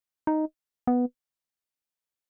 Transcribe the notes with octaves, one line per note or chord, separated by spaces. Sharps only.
D#4
B3